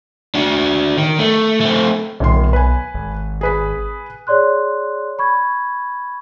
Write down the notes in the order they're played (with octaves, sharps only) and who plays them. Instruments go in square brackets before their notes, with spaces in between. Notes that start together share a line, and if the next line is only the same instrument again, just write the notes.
[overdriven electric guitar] D4 F#4
D#3
A3
A3 C4
[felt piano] D#1 D#3 C6 [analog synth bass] B1
[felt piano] B4 G#5
[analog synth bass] G#1
[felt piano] G#4 B4 B6
[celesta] G#4 C#5 D5 C6 F#6
B5 C#6 G#6